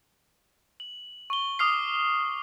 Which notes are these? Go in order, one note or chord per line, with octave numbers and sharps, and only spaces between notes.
F#7
C#6 G7
D6 D#6 F6 C7